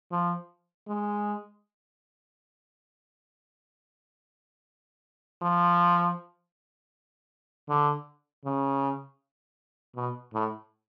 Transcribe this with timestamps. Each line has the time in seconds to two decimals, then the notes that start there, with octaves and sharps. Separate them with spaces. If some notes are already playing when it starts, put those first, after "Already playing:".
0.12 F3
0.88 G#3
5.42 F3
7.69 D3
8.45 C#3
9.96 B2
10.34 A2